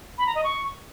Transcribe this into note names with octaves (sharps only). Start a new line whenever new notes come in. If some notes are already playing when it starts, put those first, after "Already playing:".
B5
A#5
D#5
C#6